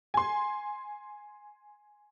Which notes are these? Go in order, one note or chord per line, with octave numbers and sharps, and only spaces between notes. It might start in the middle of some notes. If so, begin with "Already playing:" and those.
G#5 C6